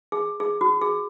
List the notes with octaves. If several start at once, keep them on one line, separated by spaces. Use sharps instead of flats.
G#4
G#4
F#4
G#4